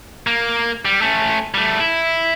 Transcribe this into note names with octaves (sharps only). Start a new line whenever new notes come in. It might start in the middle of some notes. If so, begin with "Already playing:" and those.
A#3
G3
A3 C#4
G3 A3
E4